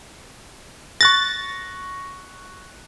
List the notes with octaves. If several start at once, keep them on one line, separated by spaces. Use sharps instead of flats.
C#6 F#6 A6 A#6